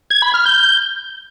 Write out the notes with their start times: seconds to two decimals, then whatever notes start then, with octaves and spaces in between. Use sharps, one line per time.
0.10 G#6
0.22 B5
0.34 F6
0.46 G6